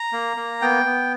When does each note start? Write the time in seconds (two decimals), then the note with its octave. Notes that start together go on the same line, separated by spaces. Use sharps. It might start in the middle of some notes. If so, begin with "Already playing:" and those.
Already playing: A#5
0.13 A#3
0.37 A#3
0.62 B3 G5
0.85 B3